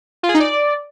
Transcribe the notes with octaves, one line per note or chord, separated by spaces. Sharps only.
F4
G#4
D#4
D5